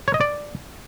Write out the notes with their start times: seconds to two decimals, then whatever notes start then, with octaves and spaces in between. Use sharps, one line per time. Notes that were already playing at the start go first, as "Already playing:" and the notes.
0.08 C#5
0.14 D#5
0.21 D5